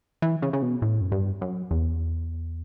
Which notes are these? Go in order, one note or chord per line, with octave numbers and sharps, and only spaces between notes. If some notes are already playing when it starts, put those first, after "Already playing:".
E3
C#3
C#3
B2
A2
F#2
G2
F#2
E2